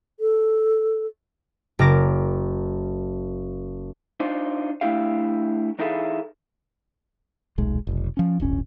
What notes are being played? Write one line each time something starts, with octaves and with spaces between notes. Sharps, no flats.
A4
F#1 A#4 D6 A#6
D4 D#4 F4 C5
A3 D4 E4 G4 F5
E3 D#4 E4 G#4 A4 F5
D#1 B1 G#3
F1 B1
F3 C#4
D1 G1 C#4